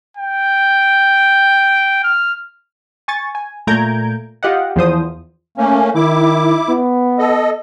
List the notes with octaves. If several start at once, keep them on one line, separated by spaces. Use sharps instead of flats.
G5
F6
G#5 C#6 A6
G#5
A#2 A3 A#5 G6 G#6 D7
F4 G4 D#5 F#5
E2 F3 C5 D#6
A3 A#3 C#4
D#3 E4 D6
B3
A4 D#5